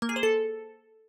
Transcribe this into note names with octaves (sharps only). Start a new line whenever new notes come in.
A#3
G#4
C5
A4